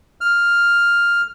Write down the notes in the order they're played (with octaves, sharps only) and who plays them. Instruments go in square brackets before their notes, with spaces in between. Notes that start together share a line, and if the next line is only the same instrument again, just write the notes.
[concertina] F6